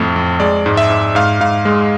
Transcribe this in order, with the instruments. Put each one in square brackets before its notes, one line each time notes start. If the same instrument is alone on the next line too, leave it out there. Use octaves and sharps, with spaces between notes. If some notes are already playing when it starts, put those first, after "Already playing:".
Already playing: [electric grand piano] F2 A2 A3
F2
G#3 D5
G#2
E5
G#2
G#2 F5
G#2 F5
G#3